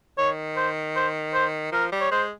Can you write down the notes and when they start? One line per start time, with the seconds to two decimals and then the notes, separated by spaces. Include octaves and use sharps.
0.18 D#3 C#5
0.57 C5
0.96 C5
1.34 C5
1.72 F3 A#4
1.92 G3
2.01 C#5
2.11 G#3 C5